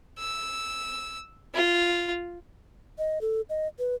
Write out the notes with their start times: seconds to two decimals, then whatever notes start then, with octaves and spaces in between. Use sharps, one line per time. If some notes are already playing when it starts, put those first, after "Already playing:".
0.19 E6
1.54 F4
2.98 D#5
3.21 A4
3.49 D#5
3.79 B4